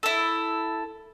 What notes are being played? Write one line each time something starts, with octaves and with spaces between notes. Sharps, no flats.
E4 A4